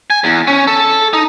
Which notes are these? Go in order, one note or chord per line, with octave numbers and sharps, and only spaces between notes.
G#5
E2
C#4
A4
D#4